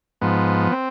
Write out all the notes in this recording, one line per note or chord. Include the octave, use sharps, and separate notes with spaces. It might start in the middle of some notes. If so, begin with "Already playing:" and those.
G#2 F3 B3
C4